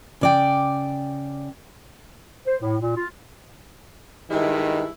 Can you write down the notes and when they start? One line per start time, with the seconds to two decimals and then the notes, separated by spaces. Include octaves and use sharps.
0.21 C#3 D5 G5
2.47 C5
2.61 A2
2.81 A#2
2.96 F4
4.30 G2 D#3 G#3 E4